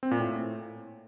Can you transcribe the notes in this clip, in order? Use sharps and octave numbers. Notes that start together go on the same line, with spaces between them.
C4
A#2
A2